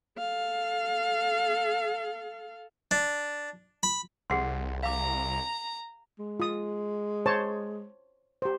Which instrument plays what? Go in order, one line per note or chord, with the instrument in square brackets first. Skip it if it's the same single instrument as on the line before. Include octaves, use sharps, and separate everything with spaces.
[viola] A4 F5
[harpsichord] D4
B5
[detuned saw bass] C2 [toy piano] G#4 F#5 C6
[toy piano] F5 D6 [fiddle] A#5
[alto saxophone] G#3
[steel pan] F4 D#6
C5 C#5 A5
G4 C5